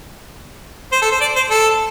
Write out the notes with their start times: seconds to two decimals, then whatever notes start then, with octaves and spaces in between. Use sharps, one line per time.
0.92 C5
1.02 A4
1.12 C5
1.21 D5
1.36 C5
1.51 A4